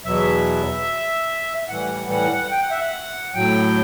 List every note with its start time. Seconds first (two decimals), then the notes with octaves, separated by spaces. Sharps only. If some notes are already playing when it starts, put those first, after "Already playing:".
0.05 E2 B2 F#3 E5
1.69 A2 E3 G3 F#5
2.11 F#5
2.51 G5
2.62 F#5
2.71 E5
2.79 F#5
3.34 A2 F#3 G5